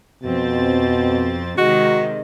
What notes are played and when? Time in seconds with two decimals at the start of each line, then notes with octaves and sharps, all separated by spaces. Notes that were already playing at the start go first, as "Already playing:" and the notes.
0.23 F2 B2 C4 A6
1.58 C3 D#3 G#3 F#4 D#5